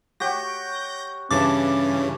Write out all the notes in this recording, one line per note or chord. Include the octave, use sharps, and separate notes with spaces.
F#4 G4 C#5 G6 A#6
G2 C#3 E3 C#4 A5 D6